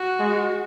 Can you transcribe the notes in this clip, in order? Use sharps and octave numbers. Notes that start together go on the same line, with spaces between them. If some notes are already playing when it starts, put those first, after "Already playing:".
Already playing: F#4
G#3